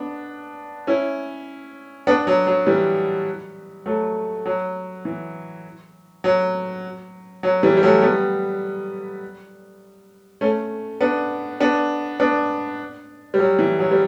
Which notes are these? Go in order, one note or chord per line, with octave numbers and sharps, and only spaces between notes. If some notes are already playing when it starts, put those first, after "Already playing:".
Already playing: B3 D4
C#4 E4
B3 D4
F#3
F#3
E3 G3
F#3 A3
F#3
E3
F#3
F#3
E3 G3
G3
F#3 A3
G3 B3
A3 C#4
B3 D4
B3 D4
B3 D4
G3
F#3
E3
F#3
G3